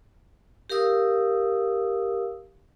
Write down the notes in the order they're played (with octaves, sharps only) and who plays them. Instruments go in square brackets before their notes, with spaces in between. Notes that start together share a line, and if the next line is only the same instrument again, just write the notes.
[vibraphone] G4 A#4 F5 D#6 E6